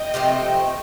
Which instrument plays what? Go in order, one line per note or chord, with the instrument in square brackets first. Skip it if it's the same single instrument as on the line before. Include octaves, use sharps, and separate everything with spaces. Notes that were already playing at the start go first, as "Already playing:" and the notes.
Already playing: [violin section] D#5 G5
[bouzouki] C3 F3 A3 C4